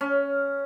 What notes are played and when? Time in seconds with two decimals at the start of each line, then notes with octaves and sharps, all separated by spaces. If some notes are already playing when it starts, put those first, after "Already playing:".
0.01 C#4